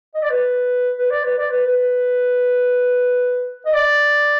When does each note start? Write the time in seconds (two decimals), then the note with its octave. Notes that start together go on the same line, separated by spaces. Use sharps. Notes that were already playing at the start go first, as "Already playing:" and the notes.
0.15 D#5
0.22 D5
0.30 B4
0.98 B4
1.11 D5
1.24 B4
1.38 D5
1.50 B4
1.67 B4
3.66 D#5
3.73 D5